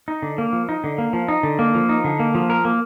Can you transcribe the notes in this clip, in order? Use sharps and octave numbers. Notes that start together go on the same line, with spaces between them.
D#4
D3
A#3
F3
D#4
D3
A#3
F3
D#4
D3
A#3
F3
D#4
D3
A#3
F3
A#4
A#3